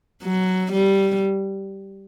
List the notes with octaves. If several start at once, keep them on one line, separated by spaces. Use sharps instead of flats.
F#3
G3